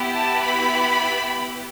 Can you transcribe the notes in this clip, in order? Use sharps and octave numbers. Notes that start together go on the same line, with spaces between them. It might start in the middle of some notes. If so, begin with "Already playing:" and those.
Already playing: B3 E4 G4
A5
B5